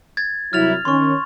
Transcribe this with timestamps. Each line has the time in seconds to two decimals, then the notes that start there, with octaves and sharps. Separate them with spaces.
0.17 G#6 A6
0.53 C2 F#3 E4 F6 A6 F7
0.85 D#3 C#4 C6 C#6